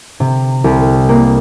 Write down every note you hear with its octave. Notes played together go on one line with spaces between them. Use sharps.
C3
C2
A#3